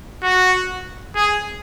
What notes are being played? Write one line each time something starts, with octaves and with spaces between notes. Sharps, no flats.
F#4
G#4